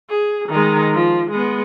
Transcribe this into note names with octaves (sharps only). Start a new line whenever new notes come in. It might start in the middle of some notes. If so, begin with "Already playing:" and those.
G#4
D#3 G#3
F3
G#3 B3